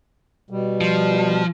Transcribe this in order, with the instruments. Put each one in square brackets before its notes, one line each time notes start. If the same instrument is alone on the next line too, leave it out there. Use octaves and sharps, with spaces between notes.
[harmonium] B2 G3
[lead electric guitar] F3